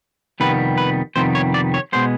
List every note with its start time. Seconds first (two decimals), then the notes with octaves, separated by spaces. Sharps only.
0.40 F2 C3 D#3 G3 B3 B4
0.78 B4
1.16 F2 C3 D#3 G3 B3 C5
1.35 C#5
1.54 D5
1.74 C#5
1.92 B2 G#3 B3 C5